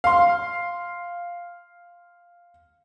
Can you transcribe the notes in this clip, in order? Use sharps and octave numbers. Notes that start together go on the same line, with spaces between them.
F5 C6